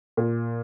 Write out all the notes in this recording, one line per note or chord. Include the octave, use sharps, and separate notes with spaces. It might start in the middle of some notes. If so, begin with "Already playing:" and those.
A#2